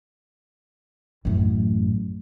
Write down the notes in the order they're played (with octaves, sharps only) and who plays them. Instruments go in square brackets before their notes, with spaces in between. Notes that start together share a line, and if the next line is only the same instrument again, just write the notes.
[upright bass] A1 F#2